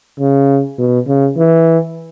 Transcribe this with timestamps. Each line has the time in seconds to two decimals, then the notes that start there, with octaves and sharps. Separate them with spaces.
0.19 C#3
0.79 B2
1.07 C#3
1.37 E3